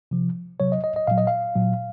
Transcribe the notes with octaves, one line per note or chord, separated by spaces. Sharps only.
C3 F3
C3 F#3 C#5
D#5
D#5
D#5
A#2 F#3 F5
D#5
F5
A#2 F#3